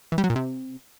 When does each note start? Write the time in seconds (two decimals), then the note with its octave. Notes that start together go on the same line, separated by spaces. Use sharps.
0.12 E3
0.18 G3
0.24 F#3
0.30 A#2
0.36 C3